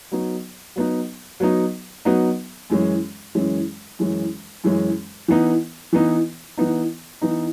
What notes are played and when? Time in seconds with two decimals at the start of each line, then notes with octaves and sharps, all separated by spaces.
0.12 F#3 B3 D#4
0.76 F#3 B3 D#4
1.40 F#3 B3 D#4
2.05 F#3 B3 D#4
2.70 F#2 E3 G#3 C#4
3.35 F#2 E3 G#3 C#4
3.99 F#2 E3 G#3 C#4
4.64 F#2 E3 G#3 C#4
5.28 E3 B3 D#4
5.93 E3 B3 D#4
6.57 E3 B3 D#4
7.22 E3 B3 D#4